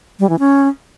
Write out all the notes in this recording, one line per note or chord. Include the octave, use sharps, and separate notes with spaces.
G3
E3
C#4